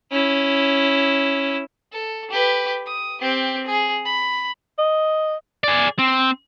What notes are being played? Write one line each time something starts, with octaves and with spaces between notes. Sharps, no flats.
C#4 E4
A4
G4 B4
D#6
C4 G4
G#4
B5
D#5
G#4 D5
C4